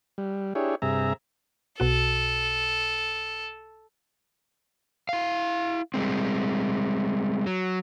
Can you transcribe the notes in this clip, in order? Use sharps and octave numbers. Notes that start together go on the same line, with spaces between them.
G3
D4 E4 G4 G#4 C#5
G2 C3 G#4 E5 A#5
B1 B2 F#4 A4
E4 F5
G3 G#3 C4
F#3